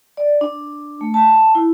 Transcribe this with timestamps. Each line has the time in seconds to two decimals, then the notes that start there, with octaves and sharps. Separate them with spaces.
0.17 D5
0.41 D4
1.01 A3
1.14 A5
1.55 E4